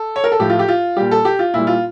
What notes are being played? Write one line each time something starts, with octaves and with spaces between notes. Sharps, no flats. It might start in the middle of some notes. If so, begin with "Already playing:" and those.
Already playing: A4
C#5
A#4
A4
A2 F3 A3 G4
F4
G4
F4
A#2 G3 G4
A4
G4
F4
A#2 G3 E4
F4